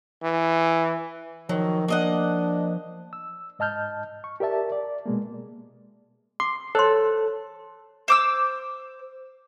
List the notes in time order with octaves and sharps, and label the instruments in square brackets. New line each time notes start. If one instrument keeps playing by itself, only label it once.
[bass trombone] E3
[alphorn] D#3 [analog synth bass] F3 [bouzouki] F#3
[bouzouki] A#3 D#5 F#5 [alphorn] D4
[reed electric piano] E6
G#2 D#5 A5 F6 G6
C#6
G4 A#4 D5 E5 A5
D5
B2 G#3 A#3
[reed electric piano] C6 [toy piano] D6
[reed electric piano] A4 [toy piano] C5 C#5 C6
[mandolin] C5 D6 E6